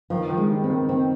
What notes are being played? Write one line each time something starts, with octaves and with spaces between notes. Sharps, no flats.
D#3 F3
D#3
G#3
G3
C4
D#3
D#3 C4